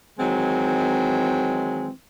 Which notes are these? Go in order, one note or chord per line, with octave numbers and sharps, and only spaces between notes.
D#3 E3 F#3 G#3 C4